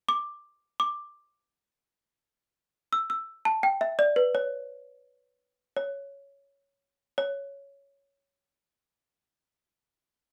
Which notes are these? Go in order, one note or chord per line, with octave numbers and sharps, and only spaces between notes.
D6
D6
E6
E6
A5
G5
E5
D5
B4
C#5
C#5
C#5